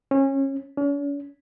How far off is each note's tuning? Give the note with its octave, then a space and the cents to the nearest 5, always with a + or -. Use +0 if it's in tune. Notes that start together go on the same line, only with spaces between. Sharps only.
C#4 -25
C#4 +45